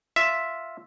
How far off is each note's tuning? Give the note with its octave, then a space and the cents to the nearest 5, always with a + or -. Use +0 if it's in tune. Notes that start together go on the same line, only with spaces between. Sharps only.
F4 +0 E5 +0